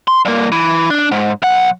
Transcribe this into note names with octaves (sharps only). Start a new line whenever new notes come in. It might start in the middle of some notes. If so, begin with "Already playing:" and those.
C6
G2 A#3
E3
D4
G#2
B1 F#5